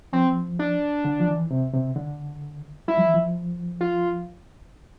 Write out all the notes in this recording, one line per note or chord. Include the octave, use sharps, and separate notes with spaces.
F3 C4
D4
D3
F3
E3
C3
C3
D3
G3 E4
F3
E3
F3
F4